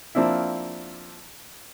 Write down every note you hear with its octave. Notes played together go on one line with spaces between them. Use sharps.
F3 A#3 C4 D4 E4